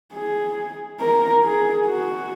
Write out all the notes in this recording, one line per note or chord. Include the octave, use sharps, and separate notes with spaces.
G#4
A#4
G#4
F#4